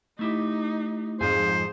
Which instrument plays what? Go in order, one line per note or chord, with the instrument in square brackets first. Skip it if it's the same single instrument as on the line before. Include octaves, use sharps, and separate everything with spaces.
[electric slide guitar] A3 E4 G4 [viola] D#4
[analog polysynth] F2 G#2 [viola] G#4 [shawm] C5 [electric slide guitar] F5 G#5